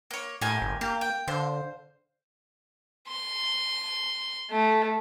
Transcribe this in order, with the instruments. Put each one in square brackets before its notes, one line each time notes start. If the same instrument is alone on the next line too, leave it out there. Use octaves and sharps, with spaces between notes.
[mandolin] A#3 C#5
[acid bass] A2 [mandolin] A#3 G4 G#5
[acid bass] G1
[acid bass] A#3 [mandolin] G4
[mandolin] G5
[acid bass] D3 [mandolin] C5 F5
[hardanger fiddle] C6
A3